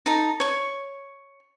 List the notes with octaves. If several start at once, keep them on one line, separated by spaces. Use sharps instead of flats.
D#4 A4 A#5
C#5 C#6